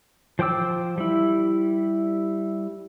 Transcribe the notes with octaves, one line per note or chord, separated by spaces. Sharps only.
F3 C5 G5 D6 E6
G3 E4